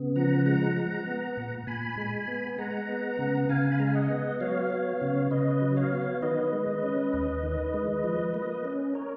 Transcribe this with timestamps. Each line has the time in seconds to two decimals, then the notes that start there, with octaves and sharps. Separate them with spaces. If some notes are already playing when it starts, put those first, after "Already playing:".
Already playing: C#3 B3
0.16 F3 F#5 A#5
0.46 G#3 F#5 A#5
0.76 G#3
1.07 B3
1.37 A#2
1.67 A#2 G#5 B5
1.97 G#3
2.28 B3
2.58 G#3 F#5 A#5
2.89 B3
3.19 C#3
3.49 C#3 F5 G#5
3.72 B5
3.79 G#3 A#5
3.87 G#5
3.95 D#5 F#5
4.10 B3
4.40 F#3 C#5 F5
4.70 B3
5.01 C#3
5.31 C#3 B4 D#5
5.62 F#3
5.77 C#5 F5
5.92 B3
6.22 D#3 B4 D#5
6.53 G#3
6.83 C#4
7.13 D#2
7.43 D#3
7.74 G#3
8.04 F3
8.34 A#3
8.65 C#4
8.95 A#4 C#5